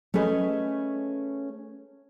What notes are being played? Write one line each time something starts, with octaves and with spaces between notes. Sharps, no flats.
A3 C#4 G#4 B4 D#5